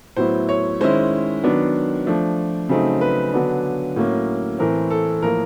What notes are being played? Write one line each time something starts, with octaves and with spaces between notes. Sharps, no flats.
A2 F#3 B3 E4 C5
C#5
D#3 G#3 C#4 E4 C5
D#3 F#3 B3 D4
F3 A3 D4
C#3 F#3 A3 C4 D#4
B4
D3 F#3 B3 D4
A2 F#3 A#3 C#4
A2 E3 A3 C4 A#4
A4
A2 F3 A#3 A#4